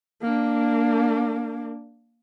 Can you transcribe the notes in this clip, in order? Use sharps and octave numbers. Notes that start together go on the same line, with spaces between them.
A#3 D4